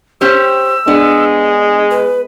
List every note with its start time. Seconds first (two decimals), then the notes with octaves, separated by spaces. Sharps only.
0.21 C#4 G4 C5 E6
0.88 G#3 B3 D4
1.91 B4